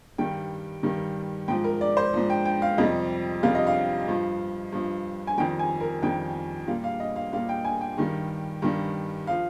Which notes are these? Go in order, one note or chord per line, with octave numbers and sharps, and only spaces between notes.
G2 D#3 G3 G5
G2 D#3 G3
G#2 F3 G5
A#4
D5
C5
G#2 F3
G5
G5
F5
F2 C3 G3 D#5
F2 C3 G3 F5
D#5
F5
G2 F3
G2 F3
G#5
F2 D#3 G3 G5
G#5
A#4
F2 D#3 G3 G5
A#2 G3 F5
F5
D#5
F5
A#2 G3 F5
G5
G#5
G5
G2 D#3 G3
G2 D#3 G3
F3 F5